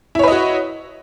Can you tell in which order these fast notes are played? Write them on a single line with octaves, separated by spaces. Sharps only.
E4 C#5 B4 D#5 F#4